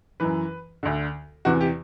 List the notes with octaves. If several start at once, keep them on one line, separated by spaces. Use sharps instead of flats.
F#2 E3 B4
D2 D3
E2 C3 E3 F#4
G4